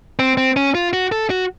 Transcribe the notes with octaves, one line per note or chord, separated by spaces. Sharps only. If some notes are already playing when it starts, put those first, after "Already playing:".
C4
C4
C#4
F4
F#4
A4
F#4